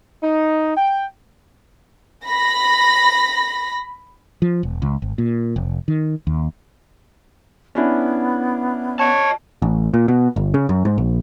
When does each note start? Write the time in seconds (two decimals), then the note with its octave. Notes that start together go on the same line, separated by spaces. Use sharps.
0.23 D#4
0.77 G5
2.25 B5 A#6
4.42 F3
4.63 E1
4.82 C#2
5.02 G#1
5.18 A#2
5.56 F1
5.88 D#3
6.27 D#2
7.75 B3 C#4 D4 E4
8.99 C#5 D#5 A5
9.62 A1
9.94 A#2
10.08 B2
10.36 G1
10.54 C#3
10.69 F#2
10.85 G#2
10.98 A#1